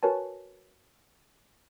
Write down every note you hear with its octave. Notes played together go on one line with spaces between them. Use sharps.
F#4 A#4 B4 C#5 G#5 A5